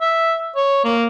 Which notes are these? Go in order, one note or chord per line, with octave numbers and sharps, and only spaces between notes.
E5
C#5
A#3